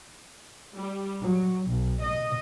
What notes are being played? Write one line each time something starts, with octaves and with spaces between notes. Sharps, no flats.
G3
F#3
B1
D#5